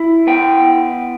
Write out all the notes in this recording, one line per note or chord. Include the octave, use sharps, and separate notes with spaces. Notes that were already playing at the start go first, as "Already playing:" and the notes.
Already playing: E4
B3 G5